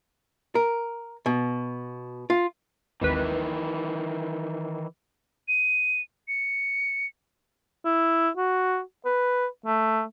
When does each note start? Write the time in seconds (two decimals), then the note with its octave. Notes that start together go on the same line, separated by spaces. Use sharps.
0.55 A#4
1.26 B2
2.30 F4
3.01 G#1 D#2 D#3 E3 B4
5.48 D#7
6.28 C#7
7.85 E4
8.37 F#4
9.05 B4
9.66 A3